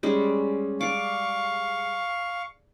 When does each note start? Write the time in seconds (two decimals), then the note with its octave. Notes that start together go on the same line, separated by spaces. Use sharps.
0.03 G3 G#3 C#4
0.81 D5 F5 C#6 D6